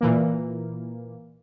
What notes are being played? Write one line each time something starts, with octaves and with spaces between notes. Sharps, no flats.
A#2 E3 A#3